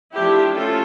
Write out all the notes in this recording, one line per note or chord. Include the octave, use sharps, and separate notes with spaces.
F3 A3 D4 E4 G4
F3 A3 C#4 F4 A4